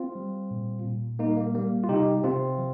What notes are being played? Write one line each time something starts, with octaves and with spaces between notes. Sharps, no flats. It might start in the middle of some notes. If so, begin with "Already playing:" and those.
Already playing: C4 F4
G3
A#2
A#2
G3 A#3 D#4
A#3
G3 A#3
F4
C3 D#4 G4
C3 C4 F4
F3